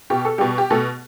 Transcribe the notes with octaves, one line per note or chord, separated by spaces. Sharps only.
B2 G4
A4
B2 G3 G4
G4
B2 A3 A4